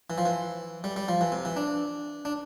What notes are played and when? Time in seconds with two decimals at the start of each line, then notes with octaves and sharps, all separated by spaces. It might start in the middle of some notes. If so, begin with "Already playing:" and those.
0.10 E3
0.18 F3
0.26 E3
0.84 G3
0.96 G3
1.08 F3
1.21 E3
1.32 C3
1.45 E3
1.56 D4
2.25 D4